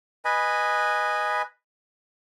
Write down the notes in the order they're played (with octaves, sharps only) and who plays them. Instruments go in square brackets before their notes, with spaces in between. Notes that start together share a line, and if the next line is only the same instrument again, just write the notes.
[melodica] B4 D#5 G#5 B5